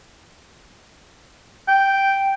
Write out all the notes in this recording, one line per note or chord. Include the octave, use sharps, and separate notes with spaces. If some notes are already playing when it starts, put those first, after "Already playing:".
G5